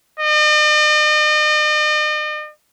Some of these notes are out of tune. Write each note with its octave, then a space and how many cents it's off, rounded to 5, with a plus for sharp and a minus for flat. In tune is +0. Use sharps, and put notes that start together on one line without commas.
D#5 -45